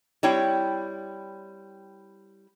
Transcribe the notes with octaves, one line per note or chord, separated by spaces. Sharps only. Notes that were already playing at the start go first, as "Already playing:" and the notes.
G3 C4 E4 C#5 G5